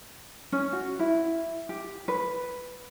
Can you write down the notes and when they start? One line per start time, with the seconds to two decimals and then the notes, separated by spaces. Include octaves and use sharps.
0.52 C#4
0.73 F#4
0.99 E4
1.69 G4
2.08 B4